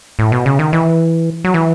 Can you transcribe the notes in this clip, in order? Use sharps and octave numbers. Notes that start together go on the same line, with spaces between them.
A2
B2
C#3
D#3
E3
F#3
E3